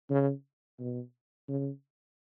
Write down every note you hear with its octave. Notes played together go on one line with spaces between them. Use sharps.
C#3
B2
C#3